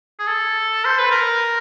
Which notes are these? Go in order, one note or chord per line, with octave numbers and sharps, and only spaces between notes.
G#4
A4
C5
B4
A#4